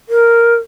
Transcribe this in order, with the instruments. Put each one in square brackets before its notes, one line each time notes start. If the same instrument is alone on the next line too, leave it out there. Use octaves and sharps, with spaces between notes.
[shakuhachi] A#4